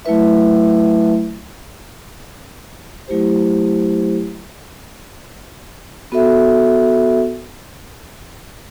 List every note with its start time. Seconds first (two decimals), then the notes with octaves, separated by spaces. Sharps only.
0.05 F#3 A3 E4 B4 E5
3.08 F#3 A3 E4 G4 C5
6.12 B3 F#4 A4 E5